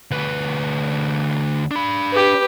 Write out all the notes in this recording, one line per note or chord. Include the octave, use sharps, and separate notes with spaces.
D2 B4
D4 B5
G4 B4